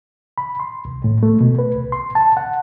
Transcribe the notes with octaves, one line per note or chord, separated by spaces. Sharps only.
B5
C6
C2
A2
A3
B2
B4
C2
C6
A5
F#5